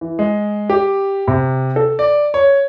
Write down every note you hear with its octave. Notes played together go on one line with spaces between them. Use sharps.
E3
G#3
G4
C3
A4
D5
C#5